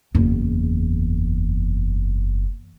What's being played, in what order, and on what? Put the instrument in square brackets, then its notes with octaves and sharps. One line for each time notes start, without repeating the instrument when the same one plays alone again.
[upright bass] F#1 E2